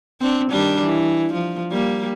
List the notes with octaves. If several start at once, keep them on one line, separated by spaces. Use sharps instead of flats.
C4 D4
D#3 G3 D4
E3
F3
G3 A#3